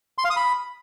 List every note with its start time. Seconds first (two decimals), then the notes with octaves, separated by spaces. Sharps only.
0.18 C6
0.24 F5
0.30 D#6
0.36 B5